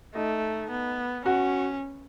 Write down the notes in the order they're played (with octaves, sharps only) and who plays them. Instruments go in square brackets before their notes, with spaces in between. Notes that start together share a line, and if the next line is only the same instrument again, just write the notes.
[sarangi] A3 [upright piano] D#4 D#5
[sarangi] B3
[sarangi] C#4 [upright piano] F#4 F#5